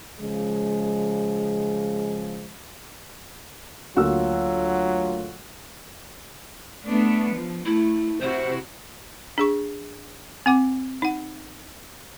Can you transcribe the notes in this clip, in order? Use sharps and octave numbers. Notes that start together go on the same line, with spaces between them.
C#3 F3 G#3
D2 F#3 A#3 F4 F#4 E6
A3 B3 D4
F3
A3 E4
C3 E4 F#4 C5
D4 G#4 C#6
C4 F#5 D6
D#4 F#5